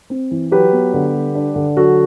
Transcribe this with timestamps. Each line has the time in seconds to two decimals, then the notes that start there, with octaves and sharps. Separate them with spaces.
0.10 C4
0.31 E3
0.51 F#3 G4 B4
0.73 B3
0.93 D3
1.14 G3
1.35 D4
1.55 D3
1.76 F#3 F#4 A4